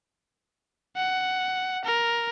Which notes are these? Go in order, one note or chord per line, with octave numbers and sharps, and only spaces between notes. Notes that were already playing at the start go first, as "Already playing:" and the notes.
F#5
A#4